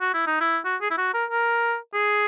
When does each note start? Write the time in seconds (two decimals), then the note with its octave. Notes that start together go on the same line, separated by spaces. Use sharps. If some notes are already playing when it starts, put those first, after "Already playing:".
0.01 F#4
0.14 E4
0.27 D#4
0.41 E4
0.65 F#4
0.82 G#4
0.91 E4
0.98 F#4
1.14 A#4
1.31 A#4
1.94 G#4